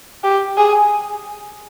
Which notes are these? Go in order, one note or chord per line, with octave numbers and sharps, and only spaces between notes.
G4
G#4